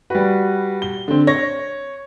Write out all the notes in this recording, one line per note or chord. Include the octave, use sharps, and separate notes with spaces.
G3 F#4 B4
G7
D3 C4
C#5 A#6